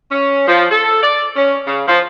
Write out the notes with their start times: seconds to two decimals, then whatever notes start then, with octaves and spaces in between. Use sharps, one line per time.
0.12 C#4
0.48 F3
0.71 A4
1.03 D5
1.36 C#4
1.67 C#3
1.88 F3